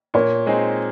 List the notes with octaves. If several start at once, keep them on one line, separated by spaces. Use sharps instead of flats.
A#2 A#4 C#5
G#3 C4 D#4 G#4